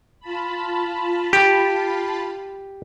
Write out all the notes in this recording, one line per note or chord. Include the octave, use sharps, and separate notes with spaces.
F4 A5 B5
G4